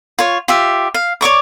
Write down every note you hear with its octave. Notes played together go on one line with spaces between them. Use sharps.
F4 C#5
F4 G4 E5
F5
C#5 D5 C#6 D6